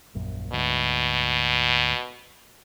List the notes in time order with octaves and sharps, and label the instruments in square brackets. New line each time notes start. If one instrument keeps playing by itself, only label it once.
[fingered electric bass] D#1 A#1 F#2
[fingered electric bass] D2 G#2 [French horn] B2